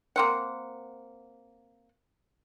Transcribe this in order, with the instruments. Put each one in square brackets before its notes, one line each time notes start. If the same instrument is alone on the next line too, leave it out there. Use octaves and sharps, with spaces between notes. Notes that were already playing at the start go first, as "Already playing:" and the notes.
[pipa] A#3 C4 F#5